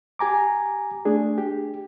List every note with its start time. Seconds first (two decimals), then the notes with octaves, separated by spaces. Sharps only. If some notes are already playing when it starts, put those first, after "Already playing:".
0.19 G4 G#5 A#5 D6
1.05 A3 D4 G#4
1.38 G4